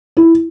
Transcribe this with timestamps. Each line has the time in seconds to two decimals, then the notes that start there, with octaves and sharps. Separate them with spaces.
0.17 E4